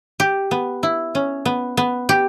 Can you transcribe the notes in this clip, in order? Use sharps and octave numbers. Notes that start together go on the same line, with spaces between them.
G4
B3
E4
C#4
B3
B3
G4